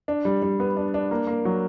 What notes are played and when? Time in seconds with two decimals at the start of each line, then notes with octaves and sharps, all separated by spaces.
0.08 D4
0.25 G3
0.42 G3
0.60 B3
0.77 D4
0.94 D4
1.11 A#3
1.27 A#3
1.45 F#3